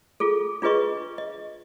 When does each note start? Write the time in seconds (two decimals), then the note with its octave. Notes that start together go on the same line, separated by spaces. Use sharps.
0.20 F4 G#4 A4
0.62 D4 F4 G#4 B4 D#5 C#6
1.18 D#5